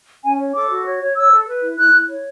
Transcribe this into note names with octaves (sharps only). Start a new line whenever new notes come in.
C#4 G#5
C#5
A4 D6
F#4
C#5
C#5
C#5 E6
A4
B4
E4
E4 F#6
E4
C#5